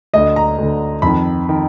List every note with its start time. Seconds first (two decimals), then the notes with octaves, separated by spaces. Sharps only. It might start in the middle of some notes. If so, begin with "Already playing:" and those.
0.13 D2 D3 D#5
0.36 A#5
0.58 D2 D3
1.02 F2 D#3 B5
1.49 D#3